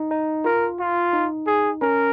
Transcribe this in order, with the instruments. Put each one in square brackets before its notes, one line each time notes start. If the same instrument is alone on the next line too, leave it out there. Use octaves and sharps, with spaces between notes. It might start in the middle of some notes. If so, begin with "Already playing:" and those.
Already playing: [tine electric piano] D#4
D#4
[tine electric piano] F4 [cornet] A#4
[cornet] F4
[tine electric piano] D#4
[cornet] G#4
[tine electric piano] C#4 [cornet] A#4